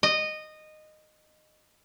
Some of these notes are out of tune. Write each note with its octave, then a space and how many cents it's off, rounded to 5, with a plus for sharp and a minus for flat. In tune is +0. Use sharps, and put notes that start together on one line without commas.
D#5 -15